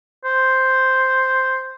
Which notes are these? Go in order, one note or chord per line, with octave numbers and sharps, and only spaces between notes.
C5